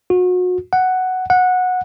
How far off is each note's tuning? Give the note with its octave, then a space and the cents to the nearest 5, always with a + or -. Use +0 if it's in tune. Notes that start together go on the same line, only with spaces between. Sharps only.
F#4 -35
F#5 +5
F#5 -15